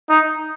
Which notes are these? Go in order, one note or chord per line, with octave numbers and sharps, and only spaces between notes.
D#4